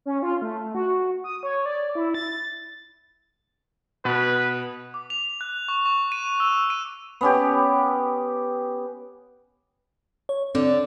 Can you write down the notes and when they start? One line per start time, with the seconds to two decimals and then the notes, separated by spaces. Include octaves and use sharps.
0.06 C#4
0.22 F4
0.42 A3
0.75 F#4
1.24 D#6
1.43 C#5
1.66 D5
1.95 E4
2.14 A6
4.05 B2 B3 B4
4.94 D6
5.10 F7
5.41 F#6
5.68 C#6
5.86 C#6
6.12 D#7
6.40 E6
6.70 D#7
7.21 B3 C#4 G4
10.29 C#5
10.55 D3 C4